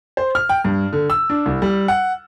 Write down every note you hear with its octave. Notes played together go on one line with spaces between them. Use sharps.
C5
F6
G5
G2
D3
E6
D4
C2
G3
F#5